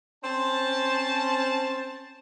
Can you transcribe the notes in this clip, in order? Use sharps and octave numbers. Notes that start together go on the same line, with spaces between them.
C4 C#4 C5 A5